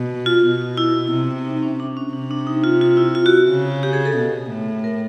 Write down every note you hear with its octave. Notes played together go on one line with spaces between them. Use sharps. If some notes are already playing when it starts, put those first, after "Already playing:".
Already playing: B2
F4
B2
E4
C3
D#4
C#4
D4
C#4
C3 D4
D4
D#4
F4
F4
E4
F4
F#4
C#3
G4
G#4
A4
B2
A2
A#4